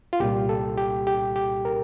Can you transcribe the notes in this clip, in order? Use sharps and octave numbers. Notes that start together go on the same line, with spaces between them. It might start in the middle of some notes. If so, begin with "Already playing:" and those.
F4
C2 A#2 G3 G4
A4
G4
G4
G4
A#4